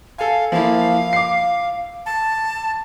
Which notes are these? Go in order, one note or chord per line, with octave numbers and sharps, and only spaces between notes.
A4 F5 G#5
F3 A#3 E4 F5
D6 C7
A5